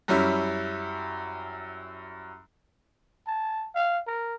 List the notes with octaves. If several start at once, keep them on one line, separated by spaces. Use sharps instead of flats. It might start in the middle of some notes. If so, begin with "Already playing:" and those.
F#2 G3 C#4 E4
A5
F5
A#4